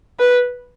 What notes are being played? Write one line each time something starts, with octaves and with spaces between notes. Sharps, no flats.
B4